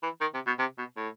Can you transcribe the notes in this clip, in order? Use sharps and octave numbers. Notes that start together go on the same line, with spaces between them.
E3
D#3
C3
B2
C3
B2
A2